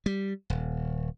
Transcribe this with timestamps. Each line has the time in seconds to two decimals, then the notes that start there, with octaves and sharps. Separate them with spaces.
0.06 G3
0.50 D#1